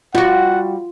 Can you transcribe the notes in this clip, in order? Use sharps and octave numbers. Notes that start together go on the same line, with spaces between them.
G3 F4 F#4 F#5